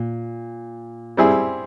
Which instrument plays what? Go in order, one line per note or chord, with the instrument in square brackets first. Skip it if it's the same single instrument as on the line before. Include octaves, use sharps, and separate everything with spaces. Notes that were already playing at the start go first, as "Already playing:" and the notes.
Already playing: [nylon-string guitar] A#2
[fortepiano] G3 C4 E4 G#4